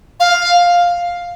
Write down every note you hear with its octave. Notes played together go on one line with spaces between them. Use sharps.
F5